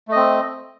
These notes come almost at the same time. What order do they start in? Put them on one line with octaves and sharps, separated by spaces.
A3 D#5 C4